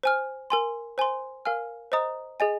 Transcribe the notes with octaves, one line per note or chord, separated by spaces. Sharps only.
C5 G#5 F6
A#4 G#5 C6
C5 G#5 C6
A#4 F5 G#5 F6
C5 D#5 A#5 D#6
G#4 D#5 G#5